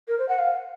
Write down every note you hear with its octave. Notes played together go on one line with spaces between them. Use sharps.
A#4
C5
F#5
F5